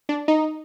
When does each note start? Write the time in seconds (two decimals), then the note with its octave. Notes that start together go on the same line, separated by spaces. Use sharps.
0.09 D4
0.28 D#4